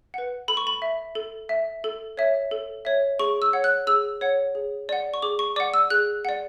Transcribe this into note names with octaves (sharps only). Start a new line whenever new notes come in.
B4 F#5
A4 B5
C#6
B5
E5
A4
E5
A4
C#5 E5
A4
C#5 E5
G#4 C#6
E6
C#5 F#5
F#6
G#4 E6
C#5 F#5
G#4
D5 F#5
C#6
G#4 D6
C#6
D5 F#5 D6
E6
G#4 F#6
D5 F#5